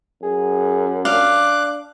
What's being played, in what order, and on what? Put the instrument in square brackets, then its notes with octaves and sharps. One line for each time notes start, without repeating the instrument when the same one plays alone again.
[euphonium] F#2 [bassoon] G#4
[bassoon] D4 [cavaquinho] F5 [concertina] D6 F#6